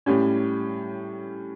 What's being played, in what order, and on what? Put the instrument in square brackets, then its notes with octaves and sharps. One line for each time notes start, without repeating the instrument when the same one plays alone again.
[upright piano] A2 G3 C#4